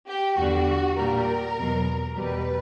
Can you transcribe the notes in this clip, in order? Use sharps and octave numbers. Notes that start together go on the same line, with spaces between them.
G4
E2 D3 G3 F#4
A#2 G3 A#4
E2 B2 F#3
E2 B2 G3 B4